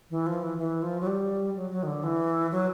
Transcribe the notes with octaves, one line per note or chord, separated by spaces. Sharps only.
E3
F3
E3
E3
F3
F#3
G3
F#3
F#3
D#3
D3
E3
F#3